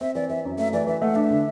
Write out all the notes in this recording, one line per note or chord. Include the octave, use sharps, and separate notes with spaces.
C4 E5
E3 D5
E3 E5
F#2
A3 E5
E3 D5
E3 E5
A3 F#5
D4 E5
D3